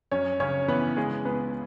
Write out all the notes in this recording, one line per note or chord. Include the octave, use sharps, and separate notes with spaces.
F#2 C#4 C#5
C#3 C#4 C#5
E3 B3 B4
C#3 G#3 G#4
C#2 B3 B4